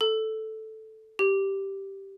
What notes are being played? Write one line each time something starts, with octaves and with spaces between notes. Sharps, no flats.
A4
G4